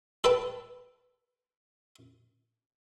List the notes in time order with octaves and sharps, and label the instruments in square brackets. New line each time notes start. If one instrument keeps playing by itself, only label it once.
[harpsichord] A4 B4 G5 A5